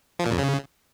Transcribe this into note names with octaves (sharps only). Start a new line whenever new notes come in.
F3
A#2
F2
C#3